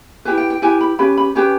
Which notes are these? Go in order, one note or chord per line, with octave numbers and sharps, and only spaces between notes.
E4 G4 B4 G#5
G5
G5
E4 G4 B4 G#5
B5
C#4 G4 B4 B5
B5
C#4 G4 B4 G#5